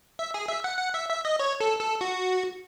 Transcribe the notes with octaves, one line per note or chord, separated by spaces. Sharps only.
E5
G#4
E5
F#5
F#5
E5
E5
D#5
C#5
A4
A4
F#4